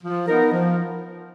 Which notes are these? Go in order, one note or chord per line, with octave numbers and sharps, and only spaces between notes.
F3
B3 D#4 A#4
F3